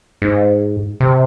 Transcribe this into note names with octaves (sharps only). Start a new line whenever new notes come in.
G#2
C3